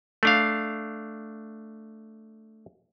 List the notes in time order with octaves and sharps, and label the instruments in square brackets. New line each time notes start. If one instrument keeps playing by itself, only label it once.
[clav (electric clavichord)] A3 D4 F5